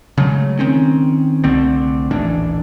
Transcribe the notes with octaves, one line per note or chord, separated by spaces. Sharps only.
C#3 F#3 G#3 A3
D#3 C4 C#4
C2 D3 A3 C4
D#1 A1 E3 D4